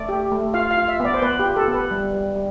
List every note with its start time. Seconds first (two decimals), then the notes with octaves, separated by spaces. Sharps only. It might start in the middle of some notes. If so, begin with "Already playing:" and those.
Already playing: A3 D5
0.09 G4
0.31 A3
0.54 F4 F5
0.71 F5
0.77 F4
0.88 E5
1.00 B3
1.05 D5
1.14 C5
1.22 B3 B4
1.39 G4
1.45 F4
1.56 A4
1.68 B3
1.74 B4
1.91 G3
2.13 G3
2.36 G3